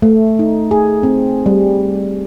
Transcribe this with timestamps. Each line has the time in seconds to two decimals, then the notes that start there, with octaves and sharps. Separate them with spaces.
0.02 A3
0.39 D#4
0.71 G#4
1.03 C4
1.46 G3